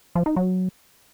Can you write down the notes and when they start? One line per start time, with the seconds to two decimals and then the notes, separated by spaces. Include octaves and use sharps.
0.15 F3
0.26 D#4
0.36 F#3